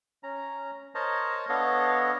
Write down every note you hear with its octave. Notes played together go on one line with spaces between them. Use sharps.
C#4 A#5
A#4 C5 C#5 D#5 A5 A#5
B3 D4 A4 C#5 D#5 F5